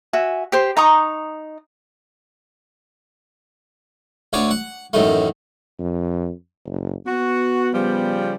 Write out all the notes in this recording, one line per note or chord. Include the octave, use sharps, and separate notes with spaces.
F#4 E5 G#5
G4 C5 C6
D#4 A#5 C#6 D#6
D2 D3 C#5 D5
F#5
A1 F#2 D#3 A3
F2
F#1
B3 F#4
C#3 F3 G3